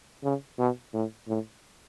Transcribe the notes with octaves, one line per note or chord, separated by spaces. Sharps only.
C#3
B2
A2
A2